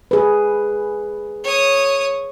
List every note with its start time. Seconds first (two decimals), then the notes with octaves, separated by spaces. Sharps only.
0.11 G#4 B4
1.44 C#5 D#6